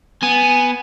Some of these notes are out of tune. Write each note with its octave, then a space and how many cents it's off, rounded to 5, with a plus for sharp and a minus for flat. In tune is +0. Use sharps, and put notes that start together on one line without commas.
B3 +0 G#5 +0